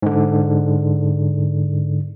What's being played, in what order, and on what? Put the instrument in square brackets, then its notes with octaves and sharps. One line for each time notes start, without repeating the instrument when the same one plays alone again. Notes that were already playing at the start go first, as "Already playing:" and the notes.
[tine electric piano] G#2 D3